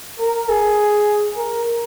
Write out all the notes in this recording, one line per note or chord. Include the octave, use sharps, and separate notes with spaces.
A#4
G#4
A#4